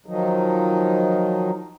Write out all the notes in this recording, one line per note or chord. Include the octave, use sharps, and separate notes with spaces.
D#3 F3 F#3 D#4